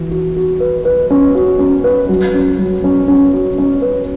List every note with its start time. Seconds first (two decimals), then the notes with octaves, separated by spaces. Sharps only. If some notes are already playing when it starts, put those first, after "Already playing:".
Already playing: E3 F#4
0.11 F#4
0.36 F#4
0.60 B4
0.85 B4
1.11 C#4
1.35 F#4
1.59 C#4
1.84 B4
2.09 F#3
2.34 C#4
2.58 F#3
2.84 C#4
3.08 C#4
3.33 F#4
3.58 C#4
3.82 B4